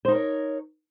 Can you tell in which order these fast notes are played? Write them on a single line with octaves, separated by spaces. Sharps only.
C5 D#4 A#4 C#5